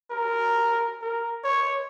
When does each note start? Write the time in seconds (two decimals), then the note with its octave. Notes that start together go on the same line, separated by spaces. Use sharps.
0.11 A#4
1.02 A#4
1.44 C#5